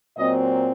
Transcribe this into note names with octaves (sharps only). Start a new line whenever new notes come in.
A#2 F#3 C4 D#5